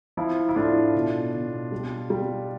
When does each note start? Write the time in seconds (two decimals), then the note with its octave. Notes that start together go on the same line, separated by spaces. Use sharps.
0.17 F3 E4
0.49 E4
0.56 A2 D4 F4
0.95 B2
1.33 B2
1.72 G3
2.10 G3